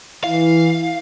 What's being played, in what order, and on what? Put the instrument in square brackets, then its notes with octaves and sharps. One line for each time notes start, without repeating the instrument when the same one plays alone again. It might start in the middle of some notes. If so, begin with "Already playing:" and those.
[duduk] E3 [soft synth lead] E4 [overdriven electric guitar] F5